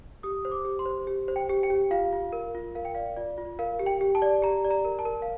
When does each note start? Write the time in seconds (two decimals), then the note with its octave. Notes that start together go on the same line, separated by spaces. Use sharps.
0.23 G4 D#6
0.45 C5
0.52 D6
0.65 G4
0.79 C6
0.86 C5
1.07 G4
1.28 C5
1.36 G5
1.49 G4
1.63 G5
1.70 G4
1.91 F4 F5
2.13 F4
2.33 A#4
2.55 F4
2.75 A#4 F5
2.85 G5
2.95 D5 F5
3.16 F4 D5
3.38 F4
3.59 A#4 F5
3.79 G4
3.86 G5
4.01 G4
4.15 A5
4.22 D5
4.42 G4 A#5
4.64 D5
4.70 A#5
4.85 A#4
4.99 A5
5.05 A#4
5.22 F5